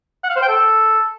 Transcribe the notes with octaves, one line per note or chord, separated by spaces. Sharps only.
F#5
F5
C5
G5
A4